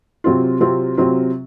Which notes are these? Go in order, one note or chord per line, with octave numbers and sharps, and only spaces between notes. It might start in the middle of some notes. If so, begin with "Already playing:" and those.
C3 F#3 C4 F4
C3 F#3 C4 F4
C3 F#3 C4 F4